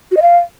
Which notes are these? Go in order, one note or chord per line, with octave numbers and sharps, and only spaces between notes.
F#4
D#5
F5